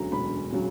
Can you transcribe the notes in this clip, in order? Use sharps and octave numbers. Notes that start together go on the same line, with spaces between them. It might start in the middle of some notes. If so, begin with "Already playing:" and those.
Already playing: E1 D2 C#3 F#3 A#5
E1 B5
C#3 F#3